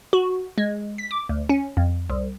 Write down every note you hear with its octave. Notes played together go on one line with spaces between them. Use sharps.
F#4
G#3
B6
D6
D2
C#4
F2
C2